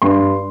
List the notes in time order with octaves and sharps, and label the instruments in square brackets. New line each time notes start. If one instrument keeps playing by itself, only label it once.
[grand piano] G2 C6